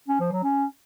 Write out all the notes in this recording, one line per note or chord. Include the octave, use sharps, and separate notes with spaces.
C#4
F3
F#3
C#4